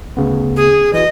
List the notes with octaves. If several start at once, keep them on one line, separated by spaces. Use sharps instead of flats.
D2 C#3 B3
G#4
E3 F#4 D#5